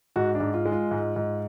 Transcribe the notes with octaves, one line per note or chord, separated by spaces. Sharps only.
G#2 F#4
D4
G#2
F4
G#3
F4
G#2
G#2